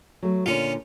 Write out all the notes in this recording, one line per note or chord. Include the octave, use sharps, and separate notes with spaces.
F#3 A3
A#2 D3 C#4 F4